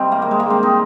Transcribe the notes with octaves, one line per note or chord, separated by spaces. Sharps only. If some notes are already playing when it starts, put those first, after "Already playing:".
Already playing: C3 D#3 G3 C4
A#3
A#3
G#3
A#3
C4
D#4